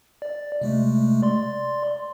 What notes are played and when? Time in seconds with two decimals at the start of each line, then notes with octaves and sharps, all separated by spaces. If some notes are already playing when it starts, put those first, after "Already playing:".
0.22 D5
0.61 C3 G#3 A3
1.22 D5 C6